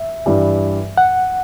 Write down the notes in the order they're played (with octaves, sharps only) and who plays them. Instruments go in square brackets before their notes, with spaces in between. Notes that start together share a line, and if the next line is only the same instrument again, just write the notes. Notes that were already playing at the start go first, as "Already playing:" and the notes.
Already playing: [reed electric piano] E5
[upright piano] G2 E3 G3
[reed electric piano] F#5